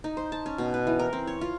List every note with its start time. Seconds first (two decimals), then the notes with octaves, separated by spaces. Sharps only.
0.04 D#4
0.17 C5
0.32 A5
0.46 C#4
0.58 B2
0.74 B4
0.87 E3
0.99 A#4
1.13 C4
1.27 C#5
1.41 F4